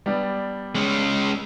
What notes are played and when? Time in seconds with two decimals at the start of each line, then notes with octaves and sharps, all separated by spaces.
0.06 G3 B3 D4
0.75 G#3 C#4